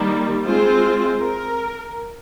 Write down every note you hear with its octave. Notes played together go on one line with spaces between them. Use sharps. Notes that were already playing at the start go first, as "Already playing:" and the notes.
Already playing: D#3 G3 A#3
G#3 C4 F4 C5
A#4